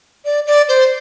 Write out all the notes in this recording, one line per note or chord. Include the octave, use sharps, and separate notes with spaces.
D5
D5
C5